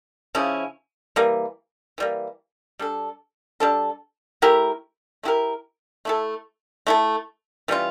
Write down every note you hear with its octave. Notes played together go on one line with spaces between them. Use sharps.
C#3 F3 C#4 E4
E3 G3 A#3
E3 G3 A#3
G3 D4 A4
G3 D4 A4
A3 E4 G4 A#4
A3 E4 G4 A#4
A3 E4 A4
A3 E4 A4
E3 G3 C#4 F4